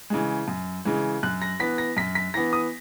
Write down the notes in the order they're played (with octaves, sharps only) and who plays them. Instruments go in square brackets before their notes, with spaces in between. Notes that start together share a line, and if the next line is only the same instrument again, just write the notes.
[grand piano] C#3 E3 G#3
F#2
C#3 E3 G#3
F#2 F#6
A#6
E3 B3 B6
A#6
F#2 B6
B6
E3 B3 A#6
D#6